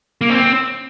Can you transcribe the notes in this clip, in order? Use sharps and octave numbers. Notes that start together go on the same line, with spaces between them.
A#3
C4